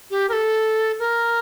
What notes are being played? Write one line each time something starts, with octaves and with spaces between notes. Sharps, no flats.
G4
A#4
A4
A#4